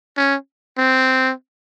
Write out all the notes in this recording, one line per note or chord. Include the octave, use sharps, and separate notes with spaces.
C#4
C4